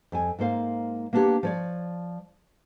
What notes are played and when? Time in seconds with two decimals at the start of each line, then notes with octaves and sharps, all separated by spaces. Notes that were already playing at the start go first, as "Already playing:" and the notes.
0.12 F2 G#5
0.39 G#2 A#3 C5 F5
1.13 A#3 B3 D4 F4 G4 C#5
1.43 F3 C#5 D5